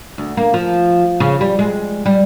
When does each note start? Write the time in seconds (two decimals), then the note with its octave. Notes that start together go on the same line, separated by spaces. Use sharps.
0.18 D2
0.37 A#3
0.54 F3
1.20 C#3
1.41 G3
1.59 G#3
2.06 G3